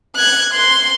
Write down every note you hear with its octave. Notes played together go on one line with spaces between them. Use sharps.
F#6 G#6
C6